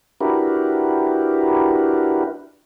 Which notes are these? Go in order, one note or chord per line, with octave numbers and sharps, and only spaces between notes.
D4 E4 F#4 G4 A#4 B4